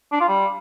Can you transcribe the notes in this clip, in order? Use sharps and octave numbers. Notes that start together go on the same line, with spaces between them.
D4
F4
G3